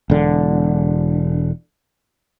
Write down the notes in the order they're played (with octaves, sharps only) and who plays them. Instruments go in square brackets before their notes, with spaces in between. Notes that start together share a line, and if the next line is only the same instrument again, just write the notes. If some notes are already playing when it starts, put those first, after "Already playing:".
[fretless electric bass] E1 D3